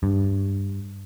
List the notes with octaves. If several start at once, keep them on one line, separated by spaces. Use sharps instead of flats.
G2